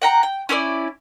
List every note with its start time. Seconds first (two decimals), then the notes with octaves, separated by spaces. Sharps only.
0.02 F#5 G5 A#5
0.23 G5
0.49 C#4 E4 C#5 D5